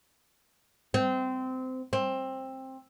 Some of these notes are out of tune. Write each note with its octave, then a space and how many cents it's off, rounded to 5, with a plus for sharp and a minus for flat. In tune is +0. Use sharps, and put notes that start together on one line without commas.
C4 -20
C4 +15